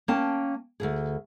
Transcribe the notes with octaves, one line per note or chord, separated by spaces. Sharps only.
A#3 C#4 G5 A5
D2 G#2 G#4